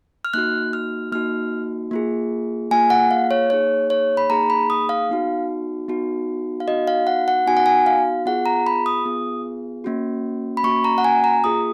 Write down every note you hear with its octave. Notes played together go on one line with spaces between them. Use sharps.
F6
A#3 D#4 F#4 F#6
F6
A#3 D#4 F#4 F6
A#3 F4 G#4
A#3 F4 G#4 G#5
F#5
F5
C#5
A#3 D#4 G#4 C#5
C#5
B5
A#3 D#4 G#4 A#5
B5
D#6
F5
B3 D#4 F#4
B3 D#4 F#4
F5
B3 D#4 F#4 D#5
F5
F#5
F#5
B3 D#4 F#4 G#5
F#5
G#5
F5
B3 F4 G#4 F#5
A#5
B5
D#6
B3 F4 G#4
A#3 C#4 F#4
B5
A#3 C#4 F#4 C#6
A#5
F#5
G#5
A#5
A#3 F4 G#4 D#6